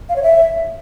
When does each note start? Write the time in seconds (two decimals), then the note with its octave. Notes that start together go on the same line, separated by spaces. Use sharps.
0.09 F5
0.16 C#5
0.23 E5